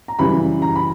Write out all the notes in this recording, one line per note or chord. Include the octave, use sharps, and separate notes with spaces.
A#5
F#2 C#3 E3 G3 B5
A#5
B5